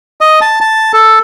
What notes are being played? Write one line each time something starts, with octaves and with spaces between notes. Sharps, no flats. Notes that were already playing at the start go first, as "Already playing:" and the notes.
D#5
A5
A5
A4